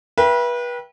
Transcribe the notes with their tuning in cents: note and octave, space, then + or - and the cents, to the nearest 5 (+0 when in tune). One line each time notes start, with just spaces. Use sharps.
B4 -30 E5 +30 G5 +0